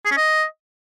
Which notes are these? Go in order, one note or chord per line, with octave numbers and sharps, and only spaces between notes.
G#4
C#4
D#5